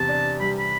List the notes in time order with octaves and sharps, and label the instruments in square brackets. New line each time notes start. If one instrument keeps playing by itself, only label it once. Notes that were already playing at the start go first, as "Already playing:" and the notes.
Already playing: [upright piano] E2 C3 [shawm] A5
[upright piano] D4
[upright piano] G3 [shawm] B5
[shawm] B5